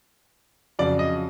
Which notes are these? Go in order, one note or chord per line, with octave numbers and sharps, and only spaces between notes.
F2 C#3 F#3 D5
D#5